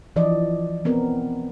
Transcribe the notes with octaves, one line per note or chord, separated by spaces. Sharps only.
E3 F3 D5 D#5
F3 B3 C4 A#4